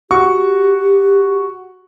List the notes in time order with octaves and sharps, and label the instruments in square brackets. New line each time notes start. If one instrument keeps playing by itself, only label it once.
[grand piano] F#4 C#6 [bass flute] G4